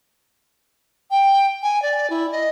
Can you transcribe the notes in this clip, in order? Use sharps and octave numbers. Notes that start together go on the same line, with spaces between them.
G5
G#5
D5
E4
D#5